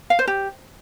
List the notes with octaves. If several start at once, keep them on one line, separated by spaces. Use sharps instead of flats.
F5
C5
G4